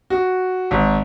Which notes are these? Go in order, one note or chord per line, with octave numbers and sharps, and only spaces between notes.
F#4
G#1